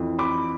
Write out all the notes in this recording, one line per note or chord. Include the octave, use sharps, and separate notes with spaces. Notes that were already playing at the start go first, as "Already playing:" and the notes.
Already playing: F2 E3
B5 D6